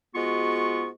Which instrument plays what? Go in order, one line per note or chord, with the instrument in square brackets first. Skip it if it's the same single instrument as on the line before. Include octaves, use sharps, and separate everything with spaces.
[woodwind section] G#2 G#3 B3 F4 F#4 C#6